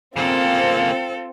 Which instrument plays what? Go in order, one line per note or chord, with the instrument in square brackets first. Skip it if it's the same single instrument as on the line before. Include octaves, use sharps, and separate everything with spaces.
[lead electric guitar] C#3 A#3 [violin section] C4 [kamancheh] F4 [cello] A4